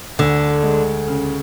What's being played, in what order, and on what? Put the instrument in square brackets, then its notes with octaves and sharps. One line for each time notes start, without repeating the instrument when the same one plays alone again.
[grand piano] D2 [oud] D3
[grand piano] G#3
C#3